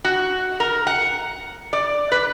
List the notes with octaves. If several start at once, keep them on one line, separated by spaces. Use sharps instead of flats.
F#4
A#4
F#5
D5
B4